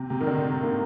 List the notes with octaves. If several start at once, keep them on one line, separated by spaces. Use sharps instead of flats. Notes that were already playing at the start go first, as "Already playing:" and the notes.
Already playing: C3
C3
D#3
D3
A#3